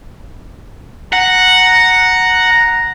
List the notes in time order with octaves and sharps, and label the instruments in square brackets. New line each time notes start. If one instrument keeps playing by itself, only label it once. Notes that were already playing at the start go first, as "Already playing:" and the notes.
[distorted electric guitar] F#5 [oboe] A#5